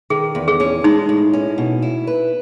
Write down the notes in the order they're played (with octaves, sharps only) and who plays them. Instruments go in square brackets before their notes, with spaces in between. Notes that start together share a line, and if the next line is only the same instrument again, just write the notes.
[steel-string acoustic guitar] D#3 [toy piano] G#4
[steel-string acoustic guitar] E2
[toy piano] G#4
[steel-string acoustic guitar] C#4
[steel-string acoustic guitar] G#3 [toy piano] D#4
[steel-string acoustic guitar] A2
C#4
B2
E4
B4